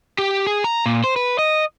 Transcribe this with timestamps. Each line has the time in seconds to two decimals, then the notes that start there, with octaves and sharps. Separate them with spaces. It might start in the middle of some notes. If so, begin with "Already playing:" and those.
0.18 G4
0.47 G#4
0.64 A#5
0.86 A#2
1.04 C5
1.16 B4
1.39 D#5